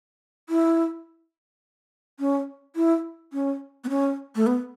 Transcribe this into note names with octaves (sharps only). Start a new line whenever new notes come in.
E4
C#4
E4
C#4
B3
C#4
A3
B3